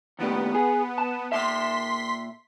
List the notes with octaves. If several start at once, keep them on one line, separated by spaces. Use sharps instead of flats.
D#2 A2 G3 B3
G#4
A5
A#2 E5 C6 B6